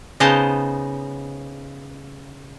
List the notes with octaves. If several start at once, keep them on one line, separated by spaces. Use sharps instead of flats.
C#3 B3 D#4 C5 D#5 A5